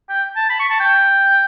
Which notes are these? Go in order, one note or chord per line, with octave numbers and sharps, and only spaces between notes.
G5
A5
B5
C#6
A5
G5